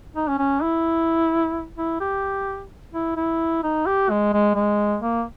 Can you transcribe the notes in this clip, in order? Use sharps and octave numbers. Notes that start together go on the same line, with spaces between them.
D#4
C#4
C#4
E4
E4
G4
E4
E4
D#4
G4
G#3
G#3
G#3
A#3